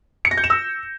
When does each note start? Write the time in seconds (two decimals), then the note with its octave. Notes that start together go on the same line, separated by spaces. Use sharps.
0.25 C#7
0.31 A#6
0.37 G6
0.44 E7
0.50 E6